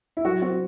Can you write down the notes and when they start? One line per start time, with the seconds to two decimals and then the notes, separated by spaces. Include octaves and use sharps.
0.17 E4
0.25 F#3 F#4
0.42 C4 F#4